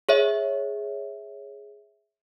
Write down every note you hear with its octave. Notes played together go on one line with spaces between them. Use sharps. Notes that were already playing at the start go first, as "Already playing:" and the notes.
G#4 C#5 E5